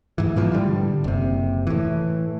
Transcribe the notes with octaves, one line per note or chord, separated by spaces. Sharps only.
G#2 E3
G#2 B2 E3 F3
A2 D3 G3
F#1 C3
A2 E3